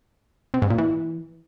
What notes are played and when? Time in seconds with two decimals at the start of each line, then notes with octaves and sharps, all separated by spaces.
0.54 C3
0.62 G#2
0.70 A#2
0.78 E3